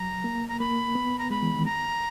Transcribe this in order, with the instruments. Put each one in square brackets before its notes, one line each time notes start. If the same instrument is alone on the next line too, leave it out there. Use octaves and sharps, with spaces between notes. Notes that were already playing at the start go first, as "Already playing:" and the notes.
Already playing: [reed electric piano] F#3 [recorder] A#5
[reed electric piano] A#3
[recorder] A#5
[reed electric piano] A#3 [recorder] B5
[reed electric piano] B3
[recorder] A#5
[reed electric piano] G#3 [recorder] B5
[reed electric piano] E3
D#3
[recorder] A#5